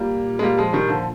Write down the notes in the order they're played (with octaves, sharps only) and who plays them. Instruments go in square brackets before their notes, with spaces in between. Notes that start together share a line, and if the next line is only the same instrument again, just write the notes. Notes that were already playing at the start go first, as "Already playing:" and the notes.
Already playing: [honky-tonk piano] A#2 [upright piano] G3 A#3
[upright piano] G#3
G3 A#3
F3 G#3
D#3 G3
D3 F3